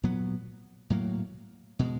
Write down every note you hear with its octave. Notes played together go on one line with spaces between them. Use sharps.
A#2 F#3 B3
A2 F#3 A#3
B2 G#3